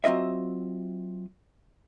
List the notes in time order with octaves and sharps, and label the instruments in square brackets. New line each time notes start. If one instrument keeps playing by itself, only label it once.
[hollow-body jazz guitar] F#3 C4 F4 D#5 E5